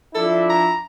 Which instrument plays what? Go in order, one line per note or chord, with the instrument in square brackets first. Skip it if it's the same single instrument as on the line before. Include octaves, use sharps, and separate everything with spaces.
[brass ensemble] F3 D4 E4 [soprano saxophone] A4
[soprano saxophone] A#5